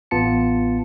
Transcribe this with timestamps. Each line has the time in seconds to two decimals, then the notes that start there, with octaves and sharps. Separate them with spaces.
0.11 A1 B3 F4 A5 C#7